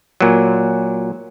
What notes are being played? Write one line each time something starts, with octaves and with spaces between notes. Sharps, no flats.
A#2 F#3